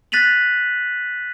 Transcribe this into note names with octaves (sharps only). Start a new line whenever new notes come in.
F#6 A6 B6 D#7 F7 F#7